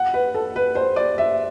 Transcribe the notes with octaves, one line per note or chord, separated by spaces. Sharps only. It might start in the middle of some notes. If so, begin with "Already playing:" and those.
Already playing: F#5
B4
A4
B4
C5
D5
E5